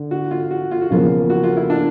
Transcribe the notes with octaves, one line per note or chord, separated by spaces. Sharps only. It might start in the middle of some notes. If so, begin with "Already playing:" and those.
Already playing: D3
F#4
F4
F#4
F4
F#4
E2 C#3 F3 A#3 F4
F#4
F4
E4
D4